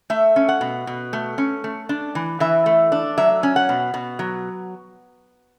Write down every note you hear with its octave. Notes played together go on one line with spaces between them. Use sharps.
A3 E5
C#4
F#5
B2
B2
A3
C#4
A3
D4
E3
E3 E5
A3
D4
F#3 E5
C#4
F#5
B2
B2
F#3